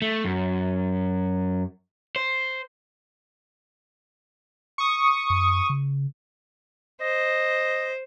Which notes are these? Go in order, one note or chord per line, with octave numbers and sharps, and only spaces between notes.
A3
F#2
C5
C#6 D#6
F#2
C#3
C5 D#5